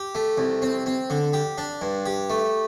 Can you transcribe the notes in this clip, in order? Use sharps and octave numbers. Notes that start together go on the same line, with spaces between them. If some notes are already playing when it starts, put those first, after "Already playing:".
Already playing: G4
A3
C2
C4
C4
D3
G4
D4
G2
G4
A3